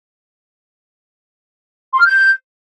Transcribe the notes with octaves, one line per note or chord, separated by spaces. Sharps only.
C6
F6
G6